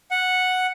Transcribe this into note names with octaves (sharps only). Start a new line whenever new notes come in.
F#5